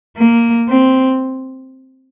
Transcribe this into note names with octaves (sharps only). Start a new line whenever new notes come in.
A#3
C4